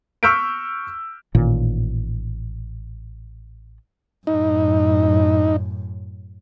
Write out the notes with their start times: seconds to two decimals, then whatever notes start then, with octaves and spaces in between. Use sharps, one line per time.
0.23 C#6 E6 F6 G6 B6 D7
1.35 A1 A#2 D#3
4.27 F#2 A2 D#4